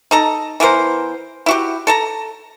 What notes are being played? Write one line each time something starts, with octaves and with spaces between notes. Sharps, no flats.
D#4 A4 A#5
E3 B3 A#4 C5
E4 F#4 G4
A4 A5 A#5